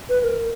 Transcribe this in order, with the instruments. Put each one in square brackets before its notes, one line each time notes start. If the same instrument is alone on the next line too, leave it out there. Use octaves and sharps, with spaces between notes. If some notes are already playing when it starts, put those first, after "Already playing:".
[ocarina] B4
B4
A#4